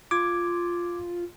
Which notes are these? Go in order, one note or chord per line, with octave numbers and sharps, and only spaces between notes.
F4 D6 G#6